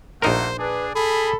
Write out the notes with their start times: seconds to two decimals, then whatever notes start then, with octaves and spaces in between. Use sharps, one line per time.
0.22 A#1 A3 A#3 D#4 A#4 C5 F#5
0.59 D4 G#4 B4
0.95 G#4 A4 B5